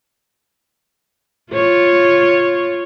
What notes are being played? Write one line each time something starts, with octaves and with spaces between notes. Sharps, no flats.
F4 C#5